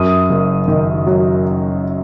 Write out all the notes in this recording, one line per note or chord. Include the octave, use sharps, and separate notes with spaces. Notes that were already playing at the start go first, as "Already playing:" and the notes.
Already playing: F#2 D#6
F#1
D#3
F#3